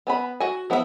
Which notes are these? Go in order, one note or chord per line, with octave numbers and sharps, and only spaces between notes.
B3 G#5 B5
F#4 G#5
F3 B3 E4 F#4 E5